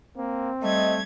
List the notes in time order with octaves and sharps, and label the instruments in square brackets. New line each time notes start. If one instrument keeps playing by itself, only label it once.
[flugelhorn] A#3 [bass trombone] C4
[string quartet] G3 G#6 [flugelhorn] A3 [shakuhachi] D#5